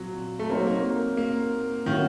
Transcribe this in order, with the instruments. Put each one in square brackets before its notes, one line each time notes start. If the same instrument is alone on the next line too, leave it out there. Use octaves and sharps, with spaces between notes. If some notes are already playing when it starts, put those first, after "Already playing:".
Already playing: [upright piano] A#2 C4 [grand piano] F#3
[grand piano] A3
[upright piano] F#3 C4 D#4 A#4 C#5 [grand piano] A#3
[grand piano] A#3
A#3
[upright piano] A2 F#3 A#3 C#4 F#4 [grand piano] D#3